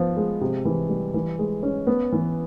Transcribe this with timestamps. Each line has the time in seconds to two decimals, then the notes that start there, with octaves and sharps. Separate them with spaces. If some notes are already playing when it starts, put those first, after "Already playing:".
Already playing: F3 B3
0.17 G#3
0.41 C3
0.65 E3
0.89 G3
1.14 E3
1.39 G#3
1.63 C#4
1.87 B3
2.12 E3